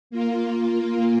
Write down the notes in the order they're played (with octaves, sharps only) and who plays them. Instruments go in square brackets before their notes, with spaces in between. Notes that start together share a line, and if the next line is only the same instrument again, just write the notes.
[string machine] A#3 F4